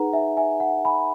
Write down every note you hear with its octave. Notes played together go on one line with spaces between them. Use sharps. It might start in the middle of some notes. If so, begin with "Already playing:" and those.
Already playing: D#4 G#4 B4 F#5 A#5
E5 G#5
E5 G#5
F#5
G#5 B5